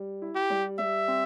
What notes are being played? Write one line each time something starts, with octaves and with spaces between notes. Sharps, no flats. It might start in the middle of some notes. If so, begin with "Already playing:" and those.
Already playing: G3
E4
G4
G3
G3 E5
C4